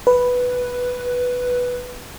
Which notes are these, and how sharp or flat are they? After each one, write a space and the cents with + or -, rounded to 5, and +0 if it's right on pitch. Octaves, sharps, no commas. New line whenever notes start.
B4 +0